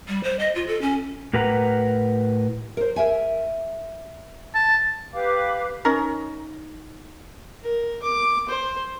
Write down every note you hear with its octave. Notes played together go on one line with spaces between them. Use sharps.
G3
C5
D#5
F4
A4
C#4
A2 G4 A#4 B4 F#5 A#5
A#4 C5
A#4 E5 G#5
A5
G4 B4 F5 D6
C#4 D#4 A#4
A#4
D6
C5